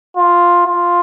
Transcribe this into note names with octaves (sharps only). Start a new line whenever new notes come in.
F4
F4